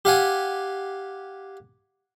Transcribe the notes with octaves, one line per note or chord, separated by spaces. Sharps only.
G4 F5 F#5 G#5